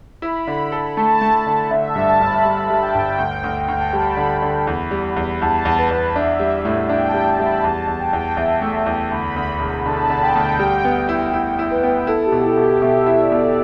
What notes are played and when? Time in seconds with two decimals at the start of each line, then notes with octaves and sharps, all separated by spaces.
0.22 E4 B5
0.47 D3
0.72 A4
0.97 A3 A5
1.21 A3
1.47 D3
1.70 D3 E5
1.89 A5
1.96 G2
2.08 A5
2.20 G1
2.26 B5
2.44 G3 B5
2.64 A5
2.70 G3
2.82 G5
2.95 G1
3.00 G5
3.18 D2 G5
3.44 D2
3.65 D2 G5
3.79 A5
3.93 G3 B5
4.17 D3
4.42 D3
4.67 E2
4.91 G3
5.16 E2
5.41 E2 A5
5.65 E2
5.78 B4
5.91 E2
6.15 D4 E5
6.40 G3
6.65 A2
6.89 D4 G5
7.08 A5
7.14 G3
7.26 A5
7.39 G3
7.45 B5
7.63 E2 A5
7.88 E2
8.00 G5
8.13 E2
8.37 E2 E5
8.61 A3
8.86 E2
9.11 D2 B5
9.36 D2
9.60 E1
9.85 D3 A5
9.95 B5
10.05 A5
10.10 D3
10.22 G5
10.35 D2
10.59 G3 G5
10.85 B3
11.09 E4
11.33 E4
11.59 E4
11.71 B4
11.83 B3
12.07 E4 A4
12.26 G4
12.32 B2
12.40 G4
12.45 E4
12.57 B2
12.63 G4
12.81 B2 E5
13.06 E4
13.18 D5
13.32 B2